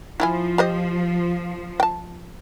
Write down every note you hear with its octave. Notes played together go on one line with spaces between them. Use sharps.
F3 E4 F4 G#5
G4 C5 D#5
G5 A5